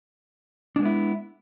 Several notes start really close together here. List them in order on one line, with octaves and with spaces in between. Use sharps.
D4 G#3 B3 E4